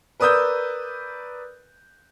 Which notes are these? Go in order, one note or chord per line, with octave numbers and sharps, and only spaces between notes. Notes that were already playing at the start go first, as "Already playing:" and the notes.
A#4 B4 D5 D#6 E6 G6